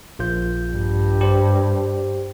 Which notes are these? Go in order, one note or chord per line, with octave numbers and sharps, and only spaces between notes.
A#1 F4 G6
G2
G4 C5